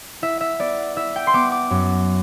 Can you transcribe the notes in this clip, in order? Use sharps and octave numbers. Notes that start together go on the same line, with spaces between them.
E4 E5
E5
B3 D5
E4 E5
G5
C6
B3 D6
D6
F#2